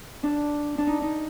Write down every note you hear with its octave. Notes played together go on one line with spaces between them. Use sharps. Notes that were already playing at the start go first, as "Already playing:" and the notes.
D4
D4
D#4
D#4